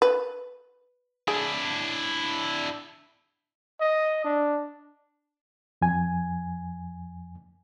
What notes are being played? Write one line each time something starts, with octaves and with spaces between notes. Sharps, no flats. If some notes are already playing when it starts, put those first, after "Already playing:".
B4
D4 E4 G#4
D#5
D4
F2 G#5